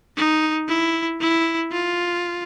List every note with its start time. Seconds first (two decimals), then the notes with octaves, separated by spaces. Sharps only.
0.17 D#4
0.68 E4
1.21 E4
1.72 F4